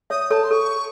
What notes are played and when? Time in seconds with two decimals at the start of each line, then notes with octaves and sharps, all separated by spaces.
0.10 C#5 E5 D#6
0.31 A4 C#5 A5
0.44 C6
0.51 A4 C#6